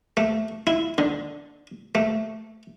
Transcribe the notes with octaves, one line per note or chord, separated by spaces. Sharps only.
A3
E4
D3
A3